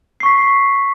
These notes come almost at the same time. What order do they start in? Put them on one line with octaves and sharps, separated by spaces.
C7 C#6 B6